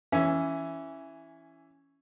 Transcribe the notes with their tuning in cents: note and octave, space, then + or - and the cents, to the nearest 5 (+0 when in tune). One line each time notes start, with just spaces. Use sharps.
E3 +0 C#4 +5